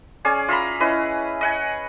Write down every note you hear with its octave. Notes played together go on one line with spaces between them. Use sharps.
C#4 G#4 D5 G#5
F4 E5 A#5 B5
C#4 E4 B4 D#5
D#5 F#5 G#5